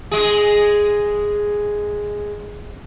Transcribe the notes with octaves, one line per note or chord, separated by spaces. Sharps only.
G#3 G#4